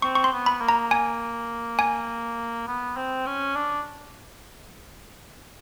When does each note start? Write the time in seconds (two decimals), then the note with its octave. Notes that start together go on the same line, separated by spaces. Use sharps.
0.02 C4 C#6
0.15 C#6
0.24 C6
0.32 B3
0.46 B5
0.61 A#3
0.69 A#5
0.91 G#5
1.79 G#5
2.67 B3
2.97 C4
3.26 C#4
3.56 D4